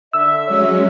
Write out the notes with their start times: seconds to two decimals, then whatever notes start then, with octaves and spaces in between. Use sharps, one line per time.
0.13 D3 E5 E6
0.47 F#3 G#3 C#4 C#5